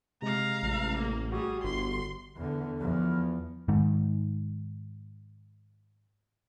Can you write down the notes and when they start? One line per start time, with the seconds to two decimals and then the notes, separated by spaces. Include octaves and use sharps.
0.22 C3 G#3 F5 A#5
0.63 A1
0.98 A#3
1.32 G3 F#4 G#4
1.64 G1 C6
2.37 E2 D3
2.79 E2 F3
3.68 G#2 D#3